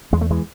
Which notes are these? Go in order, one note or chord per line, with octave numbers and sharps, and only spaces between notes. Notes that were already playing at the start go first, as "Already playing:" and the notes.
E2 G#3
A3
E3 G#3